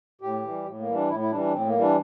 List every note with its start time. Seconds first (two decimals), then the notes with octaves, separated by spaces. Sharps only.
0.21 A2 G4
0.43 E3 G3
0.65 A2
0.79 A#3
0.86 E3 G3
0.94 D4
1.09 A2 E4
1.20 E4
1.31 E3 G3 D4
1.41 D4
1.52 A2 C4
1.66 A#3
1.74 E3 G3
1.81 D4